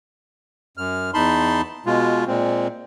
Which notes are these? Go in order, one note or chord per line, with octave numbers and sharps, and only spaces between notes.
F#2 F6
E2 D#4 A5 B5 C6
B2 G#3 F4
A#2 G#3 C4